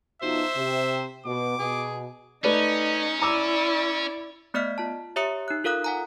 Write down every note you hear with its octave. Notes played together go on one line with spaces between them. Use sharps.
B2 F3 D#4 C5 E5
C3
B2 D6
B2 G#4
A3 C#4 D#4 B4 D5
E4 D5 A#5 D6 E6
A3 B3 D5 D#5 F6 B6
F4 A5
G4 C#5 E5 A#5 D#6 C#7
D#4 F#6
F4 A4 A#4 F5 D#6 F#6
F#5 G#5 A#5